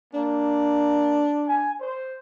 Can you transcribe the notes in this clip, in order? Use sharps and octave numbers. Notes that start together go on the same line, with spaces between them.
A#3 D4
G#5
C5